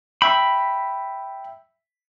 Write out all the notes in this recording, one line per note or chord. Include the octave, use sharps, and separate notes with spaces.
E5 G5 B5